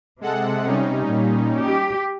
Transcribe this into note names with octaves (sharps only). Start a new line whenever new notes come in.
C3 G#3 A4 F#5
G3 C#4 D#4
A#2
G4